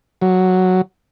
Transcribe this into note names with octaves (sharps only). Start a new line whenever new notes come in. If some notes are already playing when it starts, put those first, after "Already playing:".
F#3